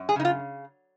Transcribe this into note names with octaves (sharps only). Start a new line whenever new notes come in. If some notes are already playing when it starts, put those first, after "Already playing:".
Already playing: F#2
G#4
C#3 D#4
F4